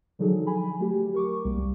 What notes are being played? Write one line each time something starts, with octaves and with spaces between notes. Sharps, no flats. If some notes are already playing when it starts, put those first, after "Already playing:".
D3 F3 F#3 D#4 G#4 A4
G#5 B5
F#3 A3 G4
A#4 C#6 D6
C2 G3 A#3